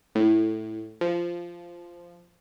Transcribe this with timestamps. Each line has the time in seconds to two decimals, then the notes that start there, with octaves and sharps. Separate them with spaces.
0.15 A2
1.01 F3